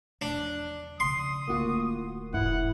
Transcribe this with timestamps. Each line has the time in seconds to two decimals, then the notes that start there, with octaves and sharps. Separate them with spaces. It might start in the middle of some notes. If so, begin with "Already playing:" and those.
0.22 E2 F3 D4
1.00 C#3 C6 D#6
1.48 D1 D2 A#3 F4 F#4
2.33 E1 G#2 E3 E4 F#5